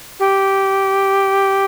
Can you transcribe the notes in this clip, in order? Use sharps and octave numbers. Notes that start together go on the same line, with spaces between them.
G4